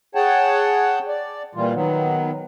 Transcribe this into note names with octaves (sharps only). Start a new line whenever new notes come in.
G#4 C#5 F#5 G5 A5
D5
A#2 E3 G3 F4
D#3 F#3 B3